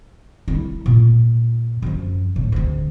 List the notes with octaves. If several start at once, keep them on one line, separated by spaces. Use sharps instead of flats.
G3 E4
A#2
F#2 F3
A2
D2 G#3